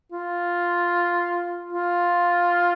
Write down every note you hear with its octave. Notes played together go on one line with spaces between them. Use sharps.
F4
F4